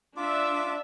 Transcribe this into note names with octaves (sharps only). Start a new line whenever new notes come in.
D4 F4 E5 D6